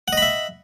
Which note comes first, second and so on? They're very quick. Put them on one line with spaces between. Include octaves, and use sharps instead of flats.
F#5 D#5 B5 E5